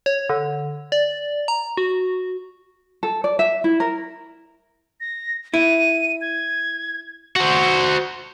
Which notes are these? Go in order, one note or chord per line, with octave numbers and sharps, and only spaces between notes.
C#5
D3
D5
A#5
F#4
A4
D5
E5
E4
A#4
A#6
E4 D#7
G#6
F#4 C5